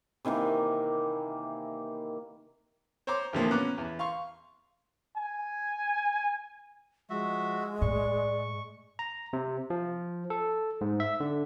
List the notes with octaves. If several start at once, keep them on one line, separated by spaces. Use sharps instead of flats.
C3 D#3 E3 A#3
C5 C#5 A#5 C6 D6
E2 G2 A#2 D3 F3 A#3
B3 C#4 A#5 D6 F#6
E2
F5 C6 C#6
G#5
F3 G#3 F#4 E5
A2 D5 C#6
A#5
C3
F3
A4
G#2
E5
D3